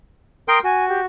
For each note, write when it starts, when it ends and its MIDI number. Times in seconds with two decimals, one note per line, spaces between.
0.48 0.59 70
0.48 0.59 79
0.48 0.59 84
0.48 0.59 87
0.64 1.06 66
0.64 0.87 80
0.89 1.00 67